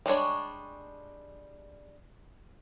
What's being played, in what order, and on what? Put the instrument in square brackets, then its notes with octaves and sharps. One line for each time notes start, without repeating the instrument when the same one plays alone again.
[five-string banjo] G3 G#3 D4 C#5